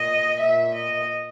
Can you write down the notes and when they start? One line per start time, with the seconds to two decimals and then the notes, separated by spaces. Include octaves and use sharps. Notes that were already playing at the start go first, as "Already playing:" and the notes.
Already playing: A#2 D#5
0.39 A#2 E5
0.74 D#5